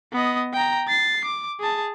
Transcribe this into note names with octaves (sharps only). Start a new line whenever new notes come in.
B3 D#5
G5 A#5
A6 C7
D6
G#4 A5